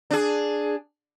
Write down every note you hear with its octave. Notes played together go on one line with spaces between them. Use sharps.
D4 G#4